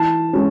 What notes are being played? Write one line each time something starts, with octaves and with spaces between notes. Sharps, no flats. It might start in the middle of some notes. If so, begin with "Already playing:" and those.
Already playing: E3 A5
G#3 C#4